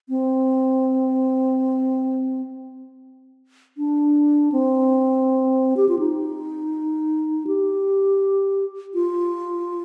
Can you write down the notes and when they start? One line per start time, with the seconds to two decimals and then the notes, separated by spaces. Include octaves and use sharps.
0.09 C4
3.78 D4
4.52 C4
5.77 G4
5.89 F4
5.99 D#4
7.47 G4
8.94 F4